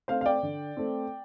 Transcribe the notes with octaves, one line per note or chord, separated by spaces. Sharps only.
A3 C4 C5 F5
F5
D5 G5
D3
A3 C4